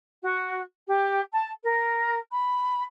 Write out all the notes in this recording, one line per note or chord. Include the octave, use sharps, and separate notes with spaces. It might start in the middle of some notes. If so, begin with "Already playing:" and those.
F#4
G4
A5
A#4
B5